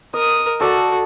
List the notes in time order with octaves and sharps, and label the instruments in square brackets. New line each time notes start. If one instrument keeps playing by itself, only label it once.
[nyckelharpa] A#4 D#6 [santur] D#5
[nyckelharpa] F#4 [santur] A4 D5